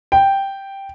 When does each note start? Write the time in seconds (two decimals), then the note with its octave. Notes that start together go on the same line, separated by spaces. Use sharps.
0.12 G5